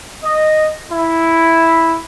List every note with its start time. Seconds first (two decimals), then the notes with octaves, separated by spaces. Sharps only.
0.24 D#5
0.92 E4